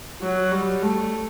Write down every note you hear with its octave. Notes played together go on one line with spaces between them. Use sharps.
F#3
G3
A3